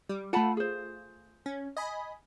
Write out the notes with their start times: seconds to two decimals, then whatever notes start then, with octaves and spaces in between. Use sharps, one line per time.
0.09 G3
0.33 A3 F4 F#5 A5 B5
0.57 G#4 C5
1.46 C#4
1.77 D#5 G#5 B5